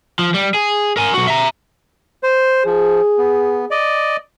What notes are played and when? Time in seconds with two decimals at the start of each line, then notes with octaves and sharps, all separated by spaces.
0.19 F3
0.34 G3
0.54 G#4
0.97 A#4 G#5
1.14 B1 F#4
1.27 E5 A#5
2.23 C5
2.66 F3 G#4
3.18 B3
3.71 D5 D#5